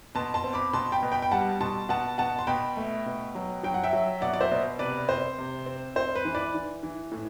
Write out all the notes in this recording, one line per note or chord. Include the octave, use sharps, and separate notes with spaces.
B2 A5 C6
A5 C6
C4
B5 D6
B2 A5 C6
G5 B5
B2
G5 B5
G5
G3 F#5 A5
B2 A5 C6
B2 F#5 A5
B2 F#5 A5
C6
B2 G5 B5
A3
B2
F#3
F#3 G5
F#5
E5 G5
F#3
B2 D5 F#5
D5
C5 E5
B2
C3 B4 D5
C4 C5
C3
C4
C4 C5
B4
E3
B4 D5
E3
E3
A2